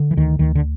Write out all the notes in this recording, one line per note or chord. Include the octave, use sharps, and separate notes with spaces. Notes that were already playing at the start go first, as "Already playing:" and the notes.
Already playing: D3
E3
D2 D#3
D2 D#3
D3